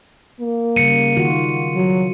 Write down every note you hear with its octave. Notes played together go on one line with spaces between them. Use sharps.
A#3
C#3 G3 C#7 D#7
D#3 F4 F#4
F#3